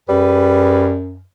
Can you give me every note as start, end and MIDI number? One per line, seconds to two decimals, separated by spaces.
0.09 1.23 42
0.09 0.95 55
0.09 0.86 68
0.09 0.86 71